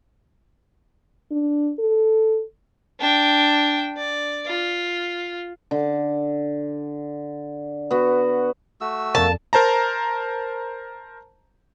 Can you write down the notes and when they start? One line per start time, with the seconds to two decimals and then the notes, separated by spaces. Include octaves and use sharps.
1.31 D4
1.79 A4
3.00 D4 G5
3.97 D5
4.47 F4
5.71 D3
7.91 B3 F#4
8.81 A3 F#4 E6
9.15 F2 A#3 A4 D5 A5
9.53 A#4 C5 A5 A#5